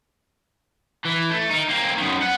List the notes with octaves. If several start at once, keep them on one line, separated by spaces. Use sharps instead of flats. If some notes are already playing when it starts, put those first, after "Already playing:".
E3
A3
D#4 A#4
A#3 C4
F#2 D#3
B3 F#5